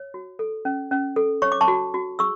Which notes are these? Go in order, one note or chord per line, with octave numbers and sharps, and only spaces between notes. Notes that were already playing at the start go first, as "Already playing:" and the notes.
Already playing: C#5
F#4
A4
C#4
C#4
A4
C#5 C#6
D6
A5 C#6
F#4
F#4
G#4 C#6 E6